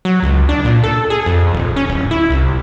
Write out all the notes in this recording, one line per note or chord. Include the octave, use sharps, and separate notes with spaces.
F#3
C#2
D4
A#2
A4
G#4
F2
D#1
C#4
D1
E4
C2